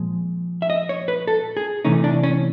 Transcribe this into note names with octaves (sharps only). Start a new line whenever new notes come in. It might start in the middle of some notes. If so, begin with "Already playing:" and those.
Already playing: A#2 F3 G#3
E5
D#5
C#5
B4
A4
G#4
C3 E3 A3 C#4 D#4
D4
C#4